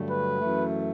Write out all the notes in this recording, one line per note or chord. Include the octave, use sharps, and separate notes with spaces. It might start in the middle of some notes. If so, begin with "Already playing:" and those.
Already playing: G2 D3 F#3 A3
B4
F#2 E3 A3